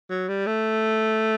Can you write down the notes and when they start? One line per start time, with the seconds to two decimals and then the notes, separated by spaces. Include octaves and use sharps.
0.10 F#3
0.28 G3
0.46 A3